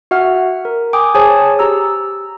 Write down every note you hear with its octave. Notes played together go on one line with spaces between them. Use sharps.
F#4 E5 F#5 F6
A#4
G5 G#5 D6 D#6
G#4 C5 C#5 G#5 A5 D#6
G4 A#5 E6